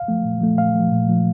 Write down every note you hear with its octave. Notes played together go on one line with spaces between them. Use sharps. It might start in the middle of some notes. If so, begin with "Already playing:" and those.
Already playing: F5
F3 A3
A#2
F3 A3
A#2 F5
F3 A3
A#2
F3 A3